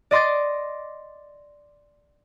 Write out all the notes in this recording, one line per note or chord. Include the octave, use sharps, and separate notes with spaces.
D5 D#5 C6 D6 A6